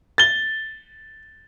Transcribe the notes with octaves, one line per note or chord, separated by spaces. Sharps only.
A6 G7